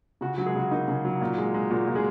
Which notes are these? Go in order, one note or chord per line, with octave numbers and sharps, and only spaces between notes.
C#3 F#4
F#3 F#4
G#3 G#4
C#3 F#4
A#3 D#4
C#3
F#3
A#2
G#3
G#3
A#2 F#4
A#2
G#3 G#4